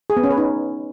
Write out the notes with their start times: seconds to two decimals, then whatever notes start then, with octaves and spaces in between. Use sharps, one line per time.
0.10 G#4
0.17 B3
0.24 C#4
0.30 B4
0.37 D#4